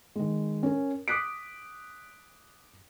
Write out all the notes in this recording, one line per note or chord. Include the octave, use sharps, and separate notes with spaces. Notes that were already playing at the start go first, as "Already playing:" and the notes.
D#3 G#3
C#4 A#4
D6 D#6 F#6 B6 D7